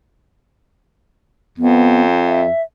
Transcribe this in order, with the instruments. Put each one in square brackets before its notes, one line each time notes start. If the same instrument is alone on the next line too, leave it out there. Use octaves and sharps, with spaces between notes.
[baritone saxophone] F2 [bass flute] B3
[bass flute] E5